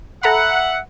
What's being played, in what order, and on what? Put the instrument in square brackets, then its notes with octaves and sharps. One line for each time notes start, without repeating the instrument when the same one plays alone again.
[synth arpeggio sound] A4 A#5 B5 [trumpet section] E5 F#5